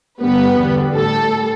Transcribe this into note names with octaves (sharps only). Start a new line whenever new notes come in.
G2 D3 G3 B3 B4
E2 D3 G3
A2 G3 A4